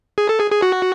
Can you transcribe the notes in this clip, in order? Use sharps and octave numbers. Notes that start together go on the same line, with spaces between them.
G#4
A4
G#4
G#4
F#4